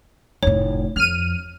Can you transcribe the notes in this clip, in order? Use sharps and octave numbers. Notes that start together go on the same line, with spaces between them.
F1 A2 C#5
F2 F6 D#7